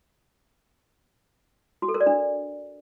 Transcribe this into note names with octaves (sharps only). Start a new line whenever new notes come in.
F#4
A4
A#4
D5
D4